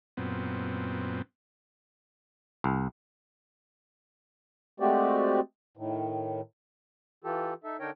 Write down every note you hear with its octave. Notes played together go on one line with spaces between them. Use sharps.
F#2 A#2 B3 C4
C2
G#3 A3 C4 F#4 G4 D5
A2 D#3
E3 F4 G4 A4
D#4 A4 E5
D3 D4 D#4 A#4 C#5 G5